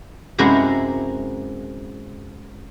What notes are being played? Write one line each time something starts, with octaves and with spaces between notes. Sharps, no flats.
F#2 C3 G#3 E4 F#4 A#5